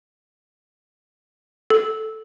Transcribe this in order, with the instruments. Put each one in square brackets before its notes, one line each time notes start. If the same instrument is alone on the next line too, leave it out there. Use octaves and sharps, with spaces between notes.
[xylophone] A4